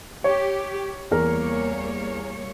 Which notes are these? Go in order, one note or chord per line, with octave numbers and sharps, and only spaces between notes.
G4 C#5
E2 G3 A#3 A#4 C#5